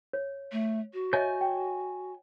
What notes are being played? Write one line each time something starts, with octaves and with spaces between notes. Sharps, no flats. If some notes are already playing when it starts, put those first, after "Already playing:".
C#5
A3
F#4
C#5 D#5 E5 G#5 G6
G5